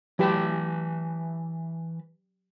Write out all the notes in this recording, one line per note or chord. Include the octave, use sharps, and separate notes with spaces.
E3 F#3 G4 B4 A5